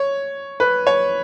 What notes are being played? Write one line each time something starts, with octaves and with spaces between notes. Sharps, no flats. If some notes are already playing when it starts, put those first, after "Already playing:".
Already playing: C#5
B4
C#5